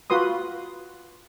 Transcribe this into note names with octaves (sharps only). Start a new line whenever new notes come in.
F4 F#4 B4 C6 D#6